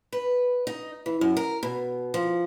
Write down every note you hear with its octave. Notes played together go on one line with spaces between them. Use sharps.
B4
D#4
E3
F#2
A#4
B2
F3